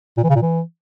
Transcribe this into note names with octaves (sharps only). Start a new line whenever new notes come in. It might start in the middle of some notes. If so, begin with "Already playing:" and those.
A#2
E3
C#3
A#2
E3